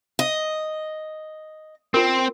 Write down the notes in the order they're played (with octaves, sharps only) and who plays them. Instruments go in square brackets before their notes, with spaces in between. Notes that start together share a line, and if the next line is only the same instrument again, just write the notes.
[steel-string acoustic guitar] D#5
[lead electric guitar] C4 [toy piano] F4 A#4